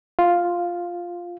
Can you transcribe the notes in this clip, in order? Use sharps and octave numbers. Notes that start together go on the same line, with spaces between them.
F4